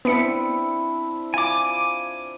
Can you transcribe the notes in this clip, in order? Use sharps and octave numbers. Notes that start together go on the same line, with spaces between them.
B3 C4 D4 E4 B6 C#7
F4 G#5 D6